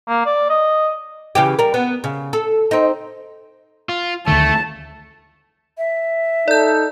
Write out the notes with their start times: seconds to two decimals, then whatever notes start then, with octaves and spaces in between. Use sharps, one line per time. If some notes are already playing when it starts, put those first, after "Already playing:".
0.08 A#3
0.26 D5
0.50 D#5
1.35 C#3 E3 G4
1.59 G3 A#4
1.74 B3
2.04 C#3
2.33 A4
2.71 C4 D#4
3.89 F4
4.27 D2 D3 D#3 A3 A5
5.78 E5
6.48 D#4 A4 D5 G6